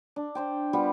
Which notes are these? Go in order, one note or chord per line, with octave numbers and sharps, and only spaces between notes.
D4
D4 C5 G5
G3 B3 F4 G4